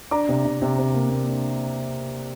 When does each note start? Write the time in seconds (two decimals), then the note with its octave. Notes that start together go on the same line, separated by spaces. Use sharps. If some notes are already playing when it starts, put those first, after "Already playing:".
0.11 D4 A#5 D6
0.29 C3
0.45 C3
0.62 C3
0.79 C3
0.94 A#3
1.11 A#3
1.28 D4